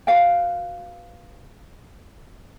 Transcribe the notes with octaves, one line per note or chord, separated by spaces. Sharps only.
F#4 B4 F5 G5